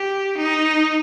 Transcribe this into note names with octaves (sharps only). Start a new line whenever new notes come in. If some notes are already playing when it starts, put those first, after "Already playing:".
Already playing: G4
D#4